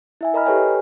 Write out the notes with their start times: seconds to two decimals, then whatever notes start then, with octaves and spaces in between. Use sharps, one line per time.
0.21 E4 E5 G#5
0.34 A#4 D#5 A#5 B5 F6
0.45 G4 A4 B4 C#5 G5 G#5